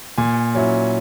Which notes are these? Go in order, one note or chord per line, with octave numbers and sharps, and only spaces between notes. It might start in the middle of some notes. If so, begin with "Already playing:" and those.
A#2 G#5
F#3 C#4 E4